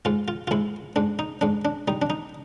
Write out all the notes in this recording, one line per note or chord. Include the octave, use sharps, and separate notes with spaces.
G#2 F4
F4
F4
G#2 E4
G#2 D4
D#4
G#2 D4
D4
G3 D#4
D4
D#4